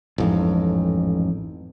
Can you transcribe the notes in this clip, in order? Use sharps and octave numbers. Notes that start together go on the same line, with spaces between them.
A1 F2 G#2